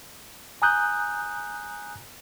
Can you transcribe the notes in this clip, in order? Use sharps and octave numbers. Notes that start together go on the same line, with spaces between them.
G#5 A#5 D#6 F#6 G6